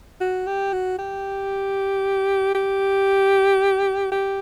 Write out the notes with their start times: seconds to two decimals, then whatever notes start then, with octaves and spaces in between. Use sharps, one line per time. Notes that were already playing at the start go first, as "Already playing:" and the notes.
0.21 F#4
0.47 G4
0.73 F#4
0.99 G4
2.55 G4
4.12 G4